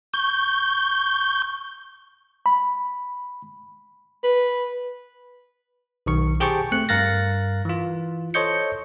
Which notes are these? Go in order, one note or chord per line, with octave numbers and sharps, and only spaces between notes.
C#6 G6
B5
B4
B1 D#3 C#6
G4 G#4 C5 G5 A5 C#6
A3 C4 F#6 C#7
G2 A#4 F5 F#6 A6 A#6
E3 F4
A4 C5 C#5 D#5 G6 C#7